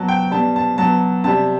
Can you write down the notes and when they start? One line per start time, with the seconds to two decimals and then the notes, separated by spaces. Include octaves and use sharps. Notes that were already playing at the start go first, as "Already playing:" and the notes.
Already playing: B2 F#3 A5
0.08 G5
0.31 B2 G3 A5
0.56 A5
0.78 B2 F#3 A5
1.24 C3 G3 A5